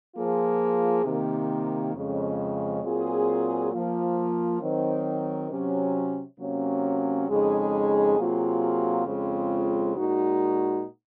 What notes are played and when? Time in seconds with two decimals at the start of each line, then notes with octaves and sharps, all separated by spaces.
0.16 F3 A#3 F4 G#4
1.04 C3 D#3 A#3
1.94 F2 C#3 G#3
2.82 A#2 F#3 C4 F4 G#4
3.72 F3 A#3 F4
4.61 D#3 F#3 C4
5.49 C3 F#3 C#4
6.38 C3 F#3 A#3 C#4
7.27 F2 C#3 G#3 D#4 G#4
8.17 C3 F#3 A#3 F4 G#4
9.06 F2 C#3 G#3 C4 F4
9.96 A#2 G#3 D#4 F#4